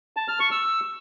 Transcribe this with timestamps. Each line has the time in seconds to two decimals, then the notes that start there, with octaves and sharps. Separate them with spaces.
0.17 A5
0.28 F6
0.40 C#6
0.51 E6